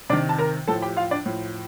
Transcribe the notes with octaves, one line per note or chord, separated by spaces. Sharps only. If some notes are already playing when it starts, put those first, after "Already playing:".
C3 D#3 D4 D5
A5
A#4 A#5
A2 F3 A4 A5
G4 G5
F4 F5
D4 D5
A2 F3